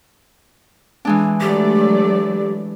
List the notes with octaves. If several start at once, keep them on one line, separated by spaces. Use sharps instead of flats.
E3 G#3 D4
F#3 A3 G4 D5